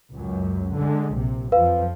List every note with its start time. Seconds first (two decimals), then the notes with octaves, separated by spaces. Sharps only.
0.12 C#2 F#2
0.75 D3 G#3
1.14 A#1 C3
1.52 F2 F3 B4 F5